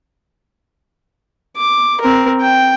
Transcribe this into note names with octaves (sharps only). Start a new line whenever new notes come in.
D6
C4 A#4
G5